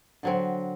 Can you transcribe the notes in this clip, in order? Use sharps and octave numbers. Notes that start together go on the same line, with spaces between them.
D3 F#3 C4